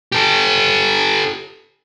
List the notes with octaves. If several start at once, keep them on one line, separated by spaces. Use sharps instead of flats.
G4 A4